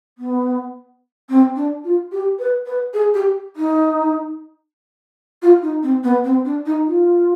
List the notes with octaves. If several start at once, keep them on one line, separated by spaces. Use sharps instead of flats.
B3
C4
D4
F4
G4
B4
B4
G#4
G4
D#4
F4
D#4
C4
B3
C4
D4
D#4
F4